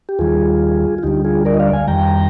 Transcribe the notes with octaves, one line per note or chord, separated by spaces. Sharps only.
G4
D#2 D#3 G3 F4 G#4
F4
D2 D3 G3 D#4 G4
F4 G#4
A#4 D5
D#5
D5 F5
F5 G#5
F2 D#3 G3 G5 A#5